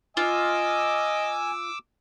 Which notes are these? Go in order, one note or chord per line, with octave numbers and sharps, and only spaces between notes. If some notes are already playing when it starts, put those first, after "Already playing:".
F4 D#5 G#5 D6 E6